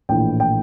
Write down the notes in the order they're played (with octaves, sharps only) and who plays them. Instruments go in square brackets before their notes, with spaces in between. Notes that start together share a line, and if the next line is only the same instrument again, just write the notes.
[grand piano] A#1 A2 E3 G5
G5